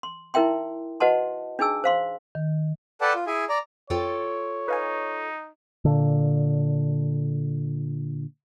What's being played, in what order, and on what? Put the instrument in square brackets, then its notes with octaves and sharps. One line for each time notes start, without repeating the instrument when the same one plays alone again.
[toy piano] C6
D#4 E4 A#4 E5 G5 C6
F#4 B4 D#5 F#5 A5 C6
D4 D#4 G#4 G#5 E6
C5 F5 C6
[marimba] D#3
[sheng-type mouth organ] A4 B4 D5 F#5 G5 A5
F4
E4 G#4 G#5
D5 A#5
[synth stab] F2 [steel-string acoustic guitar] F4 A4 G5 [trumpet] C#5
[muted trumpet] D#4 [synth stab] B4 F5 G#5
[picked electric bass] A#2 D3